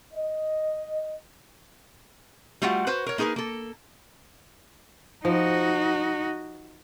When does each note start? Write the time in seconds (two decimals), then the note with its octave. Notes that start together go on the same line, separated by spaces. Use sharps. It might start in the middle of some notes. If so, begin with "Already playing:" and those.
0.14 D#5
2.62 G3 A3 F4 F#4 F5 F#5
2.87 F#4 B4 C5
3.06 A#4 C#5
3.18 A#3 D#4 G#4 A#4 B4
3.36 A#3 A4
5.25 F3 D#4 F#4